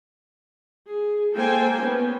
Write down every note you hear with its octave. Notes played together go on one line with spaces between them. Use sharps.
G#4
A#3 A4 C5 G5 G#5
B3 C#4